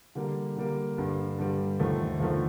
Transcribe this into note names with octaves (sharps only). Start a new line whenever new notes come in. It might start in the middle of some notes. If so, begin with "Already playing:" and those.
D3 G3 A#3
D3 G3 A#3
G2 D3 G3
G2 D3 G3
D#2 D3 F3 A3
D#2 D3 F3 A3